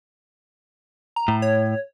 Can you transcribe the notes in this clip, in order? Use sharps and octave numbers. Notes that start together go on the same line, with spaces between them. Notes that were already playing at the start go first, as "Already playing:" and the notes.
A#5
A2
C#5